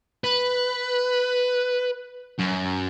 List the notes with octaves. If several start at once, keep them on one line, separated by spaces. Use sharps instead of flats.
B4
F#2